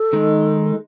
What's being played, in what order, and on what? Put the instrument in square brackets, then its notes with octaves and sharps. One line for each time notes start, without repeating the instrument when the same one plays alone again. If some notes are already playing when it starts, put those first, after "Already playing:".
Already playing: [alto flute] A4
[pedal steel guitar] D#3 G#3 D#4